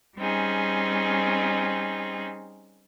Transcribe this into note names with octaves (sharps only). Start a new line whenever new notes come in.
G3 C4 C#4 D#4 G#4